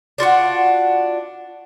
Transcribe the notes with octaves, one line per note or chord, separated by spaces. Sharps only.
D4 F4 F#4 F#5